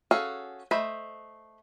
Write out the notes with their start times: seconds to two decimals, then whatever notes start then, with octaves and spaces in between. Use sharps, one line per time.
0.11 C#4 F#4 G#4 A4 F5
0.71 A3 C5 D#5 B5